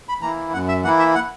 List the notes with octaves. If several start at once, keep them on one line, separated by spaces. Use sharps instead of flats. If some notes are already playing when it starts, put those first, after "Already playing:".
B5
E3 A#3 E4 A#5
F#2 F#5
E5
E3 A#3 E4 F#5
E5
F#5